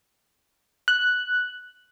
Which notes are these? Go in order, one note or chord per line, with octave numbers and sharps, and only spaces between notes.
F#6